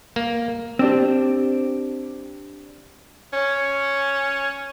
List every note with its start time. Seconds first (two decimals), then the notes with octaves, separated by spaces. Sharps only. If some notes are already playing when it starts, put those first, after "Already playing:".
0.16 A#3
0.79 C4 D4 G4
3.33 C#4